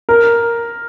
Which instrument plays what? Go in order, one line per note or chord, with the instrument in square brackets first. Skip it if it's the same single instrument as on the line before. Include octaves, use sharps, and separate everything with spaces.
[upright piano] A#4